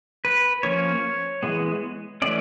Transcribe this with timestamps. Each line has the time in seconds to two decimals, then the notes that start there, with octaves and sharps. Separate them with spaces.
0.25 B4
0.63 F3 A#3 C#4 C#5
1.43 E3 G#3 B3
2.22 E3 A3 C#4 D5